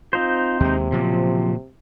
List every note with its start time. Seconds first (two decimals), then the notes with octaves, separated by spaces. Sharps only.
0.13 C4 D#4 F4 C5
0.60 D#2 C3 G#3
0.92 A#2 C#3 F3 F#3